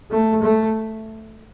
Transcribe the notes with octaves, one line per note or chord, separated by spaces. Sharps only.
A3
A3